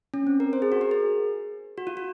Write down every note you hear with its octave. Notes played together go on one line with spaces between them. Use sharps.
C#4
C4
A#4
C5
G#4
F#4
A#4
G#4
F#4
F4
F#4